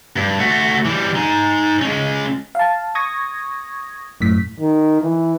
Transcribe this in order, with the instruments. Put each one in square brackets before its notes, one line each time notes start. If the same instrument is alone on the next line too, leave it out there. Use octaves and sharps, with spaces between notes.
[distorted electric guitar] G2
A3 F#4
E3 G3
D#4 G#5
G#3 C#4
[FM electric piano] F5 A5
C#6 D#6 G#6 A#6
F#2 A2 B6
[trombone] D#3
E3